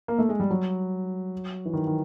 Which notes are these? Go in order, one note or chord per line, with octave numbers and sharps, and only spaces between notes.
A#3
A3
G#3
G3
F#3
E3
D#3
D#3